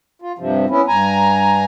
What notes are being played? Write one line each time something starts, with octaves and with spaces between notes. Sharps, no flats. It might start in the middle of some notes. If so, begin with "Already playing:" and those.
F4
G2 C3 F3
B3 C#4 E4
G2 G#5 A#5